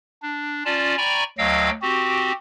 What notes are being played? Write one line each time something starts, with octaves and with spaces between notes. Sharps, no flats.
D4
C#4 F4 D5 A5
D5 G5 G#5 A#5 B5 C#6
D2 F#3 D#5 F5 G5 E6
C4 F#4 G4